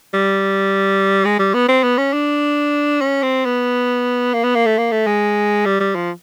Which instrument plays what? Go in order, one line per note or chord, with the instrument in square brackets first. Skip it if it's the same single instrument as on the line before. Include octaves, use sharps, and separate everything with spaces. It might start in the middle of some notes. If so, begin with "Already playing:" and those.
[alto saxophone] G3
G#3
G3
B3
C4
B3
C#4
D4
C#4
C4
B3
A#3
B3
A#3
A3
A#3
A3
G#3
G3
G3
F3